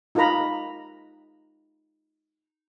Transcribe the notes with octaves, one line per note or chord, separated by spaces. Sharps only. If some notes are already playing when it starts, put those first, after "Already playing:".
D#4 F4 G4 A#4 A#5 B5